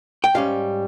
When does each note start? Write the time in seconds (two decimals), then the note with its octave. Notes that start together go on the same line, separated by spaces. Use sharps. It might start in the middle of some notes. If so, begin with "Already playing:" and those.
0.24 G5
0.34 G#2 G3 C#4 F5